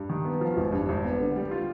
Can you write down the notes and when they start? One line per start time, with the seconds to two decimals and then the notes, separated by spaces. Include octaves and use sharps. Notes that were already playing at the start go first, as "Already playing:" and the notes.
Already playing: G2
0.10 D#3
0.25 B3
0.41 F3
0.57 G#1
0.72 G2
0.89 G#1
1.04 B3
1.20 D3
1.36 G3
1.51 F4